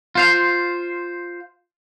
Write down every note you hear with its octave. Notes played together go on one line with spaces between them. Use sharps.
F4 C5 F5